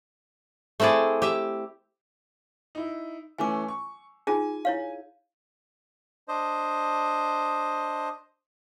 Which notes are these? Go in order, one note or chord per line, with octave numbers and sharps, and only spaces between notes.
A3 C4 E4 G#4 D5
G4 E5
D#4 E4
E3 A3 C#4 G#5 D6
C#6
D#4 F4 G#4 G#5
E4 C#5 F5
D4 C5 D#5